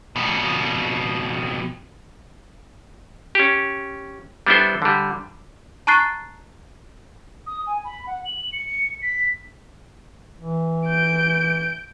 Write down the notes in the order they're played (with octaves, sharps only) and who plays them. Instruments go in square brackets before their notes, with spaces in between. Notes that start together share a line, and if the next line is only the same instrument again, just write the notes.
[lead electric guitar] F2 B2
[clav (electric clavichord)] C#4 G4
G3 B3 D4 E4 A4 C5
D3 G3
[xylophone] A5 A#5 C#6 F#6 A6 C7
[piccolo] D#6
G#5
B5
F#5
F#7
C#7
B6
[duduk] E3
[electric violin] G6 D7